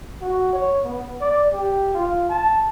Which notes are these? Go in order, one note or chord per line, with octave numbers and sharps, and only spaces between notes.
F#4
C#5
B3
D5
G4
F4
A5